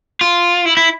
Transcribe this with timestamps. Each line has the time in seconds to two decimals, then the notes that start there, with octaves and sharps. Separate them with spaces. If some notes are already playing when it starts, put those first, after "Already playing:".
0.21 F4
0.66 E4
0.77 E4